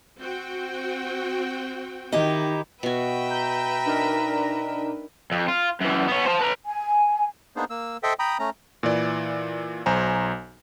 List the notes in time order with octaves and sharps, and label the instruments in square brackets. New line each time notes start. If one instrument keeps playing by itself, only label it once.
[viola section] C4 F#4 G5
[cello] D#3 [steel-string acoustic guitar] D#4 E4 G4
[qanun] B2 F#4 [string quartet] B4 E5 G5
[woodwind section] A#5 [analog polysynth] G6
[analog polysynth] D4 D#4 A#4
[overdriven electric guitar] F2
F4
F#2 E3
B3 C#5
C5 A5
B4 A#5
[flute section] G#5
[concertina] A#3 B3 D4 D#4 G#4 C5
A#3 E6
A4 C5 D#5 E5 G5
G5 A#5 B5 D#6
A3 C#4 A#5
[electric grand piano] A#2 E3 D5
B1 C5 G#5 A#5